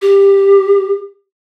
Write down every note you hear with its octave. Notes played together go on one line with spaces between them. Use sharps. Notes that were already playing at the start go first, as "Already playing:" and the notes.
G4